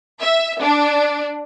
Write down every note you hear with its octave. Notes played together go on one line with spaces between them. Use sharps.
E5
D4